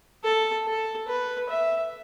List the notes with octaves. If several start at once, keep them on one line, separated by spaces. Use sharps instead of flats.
A4
A4
B4
E5